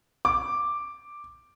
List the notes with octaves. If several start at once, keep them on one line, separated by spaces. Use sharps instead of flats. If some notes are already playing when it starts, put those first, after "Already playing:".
D6